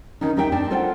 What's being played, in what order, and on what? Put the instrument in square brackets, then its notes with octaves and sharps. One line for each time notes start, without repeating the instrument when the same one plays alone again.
[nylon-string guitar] D#3 C#4 D#4
D#2 D#4 G4 E5 G5
C4 D4 G5 A5
F4 A4 A#4 C5 F#5 G5